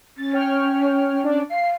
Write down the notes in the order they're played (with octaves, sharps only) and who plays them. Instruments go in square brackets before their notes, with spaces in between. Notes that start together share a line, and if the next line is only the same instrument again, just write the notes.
[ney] C#4 [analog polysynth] A6
[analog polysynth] C#5 G5 F6
D4 D5
[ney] F5 [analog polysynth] C7